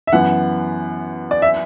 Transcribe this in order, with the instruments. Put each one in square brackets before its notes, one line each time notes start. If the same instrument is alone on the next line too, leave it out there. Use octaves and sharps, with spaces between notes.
[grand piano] E5
[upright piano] F#2 E3 B3 [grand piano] F#5
[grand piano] D5
E5